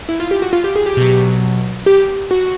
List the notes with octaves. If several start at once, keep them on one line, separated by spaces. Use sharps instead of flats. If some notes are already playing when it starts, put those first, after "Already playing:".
E4
F4
G4
F#4
F4
G4
G#4
G4
B2 F#3
G4
F#4